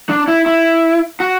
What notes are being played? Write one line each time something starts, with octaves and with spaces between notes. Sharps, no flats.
D4
E4
E4
F#4